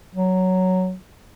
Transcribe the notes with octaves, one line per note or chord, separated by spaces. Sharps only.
F#3